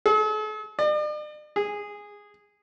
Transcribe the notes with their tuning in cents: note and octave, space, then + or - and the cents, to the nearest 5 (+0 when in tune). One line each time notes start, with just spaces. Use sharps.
A4 -45
D5 +45
G#4 -10